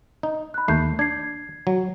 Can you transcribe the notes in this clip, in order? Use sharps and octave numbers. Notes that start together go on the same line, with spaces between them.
D#4
B5 F#6
D#2 A3 G6 C7
D4 G#6 C7
F#3